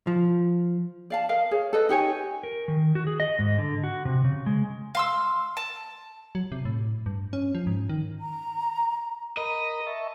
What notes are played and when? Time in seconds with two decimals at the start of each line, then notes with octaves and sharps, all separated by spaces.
0.07 F3
1.10 D5 F5 A5
1.29 A#4 D#5 F5
1.51 G#4 C#5
1.73 A4 B4 D#5
1.89 D#4 G4 C#5 G#5
2.43 A#4
2.68 D#3
2.95 F#4
3.07 G#4
3.20 D#5
3.39 G#2
3.58 D3
3.84 F#4
4.05 C3
4.25 C#3
4.46 G#3
4.95 F5 C6 E6
5.57 A5
6.35 F#3
6.52 C3
6.65 A2
7.06 G2
7.33 C#4
7.55 F3
7.67 G#2
7.89 D#3
8.20 A#5
9.37 A#4 D#5 A#5 B5
9.87 E5 A5 C#6